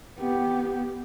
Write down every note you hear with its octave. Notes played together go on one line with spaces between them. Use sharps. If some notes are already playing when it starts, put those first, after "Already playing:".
B3 G4